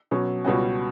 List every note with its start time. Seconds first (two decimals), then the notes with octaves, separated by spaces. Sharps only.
0.11 B2 F#3 C#4
0.44 C#2 B2 G3 C#4 F#4